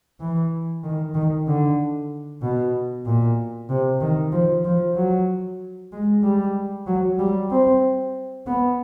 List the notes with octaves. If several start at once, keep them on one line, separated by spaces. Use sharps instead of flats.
E3
D#3
D#3
D3
B2
A#2
C3
D#3
F3
F3
F#3
G#3
G3
F#3
G3
C4
B3